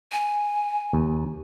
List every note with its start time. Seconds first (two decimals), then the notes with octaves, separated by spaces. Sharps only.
0.12 G#5
0.93 D#2